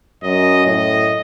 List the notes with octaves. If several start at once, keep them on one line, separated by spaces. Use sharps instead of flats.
F#2 D#5
A2 D#5